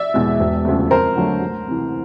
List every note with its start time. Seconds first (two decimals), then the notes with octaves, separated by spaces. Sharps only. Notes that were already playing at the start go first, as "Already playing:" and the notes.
Already playing: D5 E5
0.14 E2 B2 G#3
0.40 E1
0.65 D2 C#3 F3 A3
0.90 F2 A#4 C5
1.16 D3 F#3 A3
1.41 D2
1.67 C3 E3